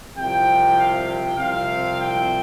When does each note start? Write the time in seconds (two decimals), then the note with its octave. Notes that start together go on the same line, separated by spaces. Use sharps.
0.16 C2 C3 F3 G5
0.77 F5
1.08 G5
1.37 C2 C3 F3 C4 F5
1.98 G5